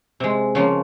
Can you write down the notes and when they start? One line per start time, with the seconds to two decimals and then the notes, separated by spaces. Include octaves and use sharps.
0.20 C3 G#3
0.55 C#3 F3 A#3